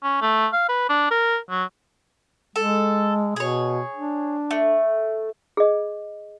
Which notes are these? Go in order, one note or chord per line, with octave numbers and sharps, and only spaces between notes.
C#4
A3
F5
B4
D4
A#4
F#3
G#3 A4
B2 G#4 C#5
D4
A3
G#4 D#5